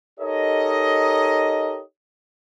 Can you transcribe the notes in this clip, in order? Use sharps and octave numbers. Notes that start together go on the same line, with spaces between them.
D#4 G4 A4 A#4 C#5 D#5